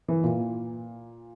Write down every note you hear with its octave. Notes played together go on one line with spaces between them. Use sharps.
E3
A#2